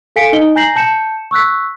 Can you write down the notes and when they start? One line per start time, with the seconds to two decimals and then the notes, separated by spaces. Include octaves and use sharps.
0.16 A4 F5 G#5 B6 C#7 D7
0.33 D#4 D#5 G7
0.55 G#5 A#5 G6 A#6 C7 F#7
0.76 A5 G6 C#7 E7
1.31 C#6 E6 F#6 B6